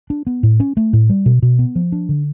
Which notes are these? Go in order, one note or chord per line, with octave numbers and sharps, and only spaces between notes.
D4
B3
A2
C#4
A3
A2
G3
B2
B2
B3
F3
D4
D3